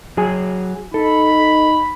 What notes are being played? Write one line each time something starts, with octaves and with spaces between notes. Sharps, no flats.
F#3 G#4 G#5
D#4 A4 B5